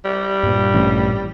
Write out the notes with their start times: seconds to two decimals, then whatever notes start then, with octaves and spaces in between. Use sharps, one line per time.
0.05 G3
0.43 G2 A#2
0.74 A1